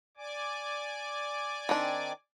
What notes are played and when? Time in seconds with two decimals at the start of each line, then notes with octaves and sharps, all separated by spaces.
0.17 D5 G#5 D6
1.69 D#3 C4 D4